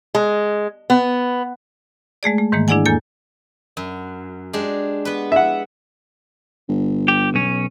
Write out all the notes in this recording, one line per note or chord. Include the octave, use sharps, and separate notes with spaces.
G#3
B3
G#3 A3 G#4 D5
A3
G#2 D#3 E3 G#3 A#3
D4 E4 G#4 D5 F#5 G#5
E2 A#3 A4 G#5
F#2
G#3 D4 G4
B3 B4
E5 F#5
G1
G4
B1 C#4